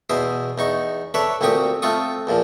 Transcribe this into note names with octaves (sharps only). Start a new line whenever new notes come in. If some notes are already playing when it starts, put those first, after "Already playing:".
E2 B2 E4 C5 D#6
E2 D#4 C#6
A4 B4 C#5 D5 E5
D2 A#2 C4 G4 C#6 D#6
A3 C4 F4 C#6 D#6
E2 A#2 F3